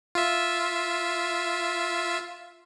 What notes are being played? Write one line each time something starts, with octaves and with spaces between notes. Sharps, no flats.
F4 E5